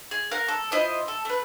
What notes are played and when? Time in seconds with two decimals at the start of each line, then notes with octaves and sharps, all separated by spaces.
0.11 G#4
0.31 A#4 F5 F#5
0.48 A4
0.72 E4 F4 C5 D#5
1.08 A4
1.25 A3 B4